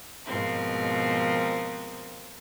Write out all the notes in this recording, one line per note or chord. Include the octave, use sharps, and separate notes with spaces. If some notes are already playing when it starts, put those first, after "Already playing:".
G#2 B2 F3 C4 A#4